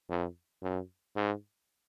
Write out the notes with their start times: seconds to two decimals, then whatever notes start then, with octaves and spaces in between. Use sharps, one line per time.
0.09 F2
0.62 F#2
1.16 G#2